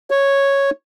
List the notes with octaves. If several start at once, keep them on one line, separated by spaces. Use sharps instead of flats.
C#5